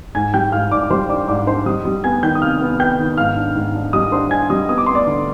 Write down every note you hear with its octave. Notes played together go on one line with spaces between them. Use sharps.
G#2 G#5 G#6
G3 G5 G6
G#2 F5 F6
G#2 D5 D6
D6
G3 C5 C6
D4 D5 D6
G#2 D5 D6
D4 C5 C6
G3 D#5 D#6
G3
B3 G#5 G#6
D#3 G5 G6
D#6
C3 F5 F6
B3
B3 G5 G6
D#3
G#2 F5 F6
D4
G#2
D4
G3 D#5 D#6
D4 C5 C6
D4 G#5 G#6
G3 D#5 D#6
B3 D#6
D6
B3 C6
D5 D6
D3